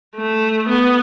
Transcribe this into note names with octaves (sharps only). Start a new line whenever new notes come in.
A3
B3